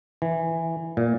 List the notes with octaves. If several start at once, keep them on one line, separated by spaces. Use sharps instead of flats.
E3
A#2